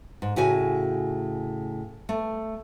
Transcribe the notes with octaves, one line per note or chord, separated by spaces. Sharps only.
G#2
A2 C#3 F#4 G#5
A3